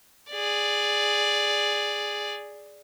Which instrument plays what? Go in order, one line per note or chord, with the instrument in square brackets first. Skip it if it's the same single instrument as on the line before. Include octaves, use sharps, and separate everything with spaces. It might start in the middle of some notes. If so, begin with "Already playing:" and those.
[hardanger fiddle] G#4 D5